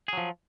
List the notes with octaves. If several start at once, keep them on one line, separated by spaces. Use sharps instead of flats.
F3 F#3 G#4